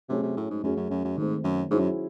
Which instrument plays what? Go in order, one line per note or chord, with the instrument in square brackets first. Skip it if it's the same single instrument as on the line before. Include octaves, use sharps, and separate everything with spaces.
[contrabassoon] C3 [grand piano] F#3 A3 C#4 G#4
[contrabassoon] C3
A2
G#2
[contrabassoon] F#2 [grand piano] F#3 A3 C#4 G#4
[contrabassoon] F#2
F#2
F#2
[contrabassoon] G#2 [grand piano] D#3 A3 C4
[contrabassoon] F#2
[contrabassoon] G#2 [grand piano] F#3 C#4 E4 G#4 C5
[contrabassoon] F#2